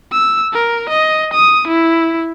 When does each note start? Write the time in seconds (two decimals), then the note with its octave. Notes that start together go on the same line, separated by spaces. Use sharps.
0.12 E6
0.53 A#4
0.89 D#5
1.33 D#6
1.68 E4